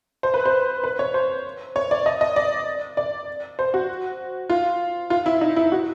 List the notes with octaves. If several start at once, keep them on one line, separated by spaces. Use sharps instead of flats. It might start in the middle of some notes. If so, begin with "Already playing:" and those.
C5
B4
C5
B4
C#5
C5
C#5
D5
D#5
D#5
D5
D5
C5
F#4
F4
F4
E4
D#4
E4
F#4